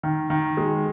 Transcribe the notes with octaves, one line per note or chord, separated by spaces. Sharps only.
D#3
D#3
G#3